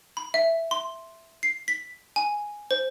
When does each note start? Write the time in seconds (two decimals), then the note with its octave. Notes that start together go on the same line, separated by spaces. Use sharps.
0.17 B5
0.34 E5
0.71 C6
1.43 C7
1.68 B6
2.16 G#5
2.71 C5